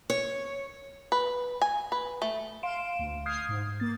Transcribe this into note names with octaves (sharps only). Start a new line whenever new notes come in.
C#5
B4
G#5
B4
A3
F5 C6 D7 E7
D2
D#6 F6 G6 G#6 C7
G#2
A#3 A6